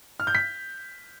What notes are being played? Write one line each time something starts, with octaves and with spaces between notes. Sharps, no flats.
F6
G6
B6